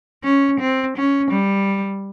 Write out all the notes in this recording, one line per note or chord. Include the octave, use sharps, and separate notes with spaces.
C#4
C4
C#4
G3